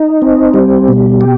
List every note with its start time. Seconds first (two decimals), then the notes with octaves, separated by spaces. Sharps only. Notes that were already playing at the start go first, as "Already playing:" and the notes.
Already playing: D#4
0.22 C4
0.54 G3
0.88 B2
1.21 G4